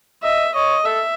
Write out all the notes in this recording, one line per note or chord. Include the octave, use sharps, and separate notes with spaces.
D#5 E5
C#5 D#5
A4 E5